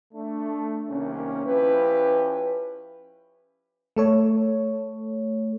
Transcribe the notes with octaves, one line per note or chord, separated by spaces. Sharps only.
A3 D4
C2 D#3 A#3 C#4
F3 C#4 E4 G4 B4
A3 A4 C#5